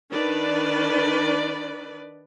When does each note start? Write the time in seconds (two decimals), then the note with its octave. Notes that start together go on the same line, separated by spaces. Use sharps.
0.12 D#3 D4 B4 D5